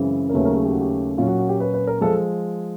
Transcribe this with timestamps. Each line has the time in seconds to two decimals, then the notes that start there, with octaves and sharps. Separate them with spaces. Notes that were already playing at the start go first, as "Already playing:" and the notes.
Already playing: F#2 C#3 E3 G#3 C4
0.29 A#4
0.34 D#2 C#3 F#3 A3 C#4 B4
0.45 A#4
0.56 G#4
0.65 G4
0.73 F#4
0.81 G4
1.18 A#2 F#3 A#3 C#4 F4
1.28 F#4
1.39 F#4
1.49 G4
1.60 B4
1.74 B4
1.87 A#4
2.01 F3 G#3 A4